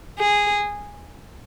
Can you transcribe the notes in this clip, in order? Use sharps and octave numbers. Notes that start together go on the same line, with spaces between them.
G#4